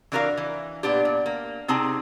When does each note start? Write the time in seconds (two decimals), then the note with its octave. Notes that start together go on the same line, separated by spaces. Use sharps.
0.12 E3 D4 F#4 A#4 B4 F5
0.37 E3
0.83 A#2 B3 D4 G4
1.05 A#2
1.26 A#3
1.68 C3 C4 D#4 G#4 A5